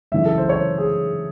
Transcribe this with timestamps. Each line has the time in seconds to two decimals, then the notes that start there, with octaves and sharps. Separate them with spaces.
0.12 F#2 C#3 E3 G#3 E5
0.25 A4
0.38 C5
0.49 C#5
0.78 G#4